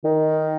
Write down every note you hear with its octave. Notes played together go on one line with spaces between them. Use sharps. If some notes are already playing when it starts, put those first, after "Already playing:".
D#3